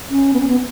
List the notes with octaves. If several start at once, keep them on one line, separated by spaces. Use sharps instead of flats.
C#4
B3
C#4
B3